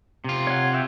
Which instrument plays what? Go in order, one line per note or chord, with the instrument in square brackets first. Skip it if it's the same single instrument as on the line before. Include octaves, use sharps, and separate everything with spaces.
[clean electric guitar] C3 F4
[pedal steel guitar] C#5 F#5
F#4 E5 G5